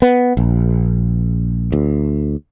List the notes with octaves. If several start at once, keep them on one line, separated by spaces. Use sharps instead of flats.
B3
A#1
D2